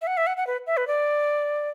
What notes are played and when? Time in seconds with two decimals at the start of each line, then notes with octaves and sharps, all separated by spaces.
0.02 E5
0.07 F#5
0.17 E5
0.27 F#5
0.37 F#5
0.47 B4
0.67 E5
0.77 B4
0.87 D5